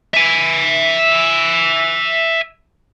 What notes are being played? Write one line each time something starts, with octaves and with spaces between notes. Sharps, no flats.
E5 G#5